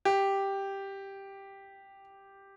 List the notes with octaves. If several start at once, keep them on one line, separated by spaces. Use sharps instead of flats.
G4